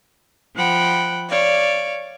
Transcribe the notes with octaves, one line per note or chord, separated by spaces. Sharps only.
F3 F#5 G5 B5
C#5 D5 F5